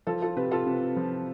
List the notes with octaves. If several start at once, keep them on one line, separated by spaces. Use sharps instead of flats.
F3 F4 A4
F4 A4
C3 G4 B4
F4 A4
C3
F3